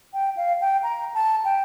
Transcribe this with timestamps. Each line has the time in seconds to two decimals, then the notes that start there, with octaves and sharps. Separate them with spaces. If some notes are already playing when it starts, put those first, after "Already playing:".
0.14 G5
0.37 F5
0.61 G5
0.83 A#5
1.14 A5
1.45 G5